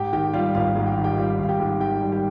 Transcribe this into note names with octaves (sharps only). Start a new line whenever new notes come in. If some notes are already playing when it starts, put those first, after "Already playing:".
Already playing: G#2 G4 G5
D#3 G4 G5
G3 F4 F5
G#1 F4 F5
G#2
G5
D#3
G4 G5
G3 F4 F5
G#1 F5
G4 G5
G#2
D#3 G4 G5
G3
G4 G5